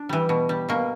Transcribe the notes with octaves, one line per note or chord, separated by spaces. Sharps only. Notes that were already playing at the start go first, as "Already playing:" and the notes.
Already playing: D4
E3 G3
B2
G3
B2 A#3